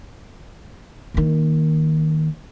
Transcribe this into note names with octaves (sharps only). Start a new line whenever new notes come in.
D#3 A#3